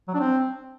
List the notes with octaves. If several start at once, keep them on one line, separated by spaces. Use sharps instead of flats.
F#3
D4
C4